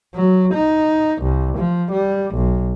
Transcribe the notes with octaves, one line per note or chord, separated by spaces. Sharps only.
F#3
D#4
C2
F3
G3
B1